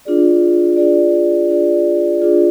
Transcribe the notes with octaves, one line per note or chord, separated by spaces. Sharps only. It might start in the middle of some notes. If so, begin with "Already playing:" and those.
D4 F4 G#4 D5
D4 F4 G#4 D5
D4 F4 G#4 D5
D4 F4 G#4 D5